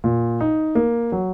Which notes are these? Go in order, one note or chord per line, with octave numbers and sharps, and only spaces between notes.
A#2
D#4
A#3
F#3